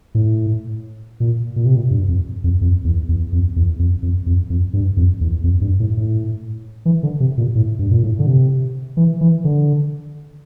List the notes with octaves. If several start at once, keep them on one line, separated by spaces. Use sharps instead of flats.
A2
A#2
A#2
C3
A#2
G2
F2
F2
F2
E2
E2
F2
E2
F2
F2
F2
F2
G2
F2
E2
F2
G2
A2
A2
E3
D3
C3
A#2
A2
G2
A#2
A2
D3
C3
E3
E3
D3